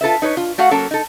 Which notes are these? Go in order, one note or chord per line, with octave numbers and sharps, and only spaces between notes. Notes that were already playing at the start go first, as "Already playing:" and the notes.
F4 A4 B4 E5
D#4 B4 C#5
F4
A3 F#4 F5 F#5
F#3 A#3 C#4 A4
D#4 A4